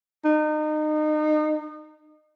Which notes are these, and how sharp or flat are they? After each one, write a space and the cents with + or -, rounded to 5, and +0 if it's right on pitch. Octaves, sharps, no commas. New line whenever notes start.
D#4 -30